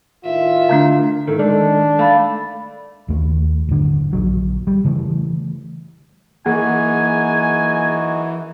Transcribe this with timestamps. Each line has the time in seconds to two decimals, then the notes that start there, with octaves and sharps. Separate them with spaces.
0.25 A2 D#3 F4 E5
0.69 D3 A3 D4
1.27 A2 D#3 A4
1.39 D#3 G#3 D4
1.99 A3 F5 B5 A6
3.08 D#2 A3
3.69 D1 G1 D3
4.13 A#1 D#2 F#3
4.67 G3
4.84 C#3 E3 G#3 A3
6.46 F#2 E3 A#3 D#4 F#4 G#4 F#5 G#5